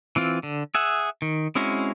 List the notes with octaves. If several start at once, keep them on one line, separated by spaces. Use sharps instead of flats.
E3 C4 F4
D3
G#4 E5 F#5
D#3
G#3 C4 C#4 E4 F#4